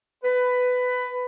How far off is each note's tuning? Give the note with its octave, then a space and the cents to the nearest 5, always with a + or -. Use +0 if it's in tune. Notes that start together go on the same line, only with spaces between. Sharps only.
B4 +15